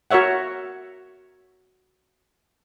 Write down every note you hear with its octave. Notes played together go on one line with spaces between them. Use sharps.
F#4 A#4 C#5 E5 F#5